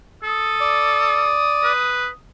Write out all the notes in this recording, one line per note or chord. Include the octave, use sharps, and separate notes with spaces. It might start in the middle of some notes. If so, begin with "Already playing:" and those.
A4 D#6
D5
B4